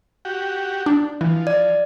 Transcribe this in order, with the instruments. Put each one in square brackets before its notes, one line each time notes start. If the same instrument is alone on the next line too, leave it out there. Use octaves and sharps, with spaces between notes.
[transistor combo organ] F#4 G4
[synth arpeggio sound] D4
[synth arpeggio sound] E3 [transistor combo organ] F3
[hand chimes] D5